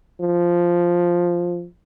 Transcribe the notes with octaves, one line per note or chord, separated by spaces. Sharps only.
F3